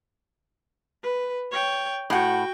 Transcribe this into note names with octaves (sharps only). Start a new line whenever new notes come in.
B4
C#5 G5
A2 F#4 F#5 G5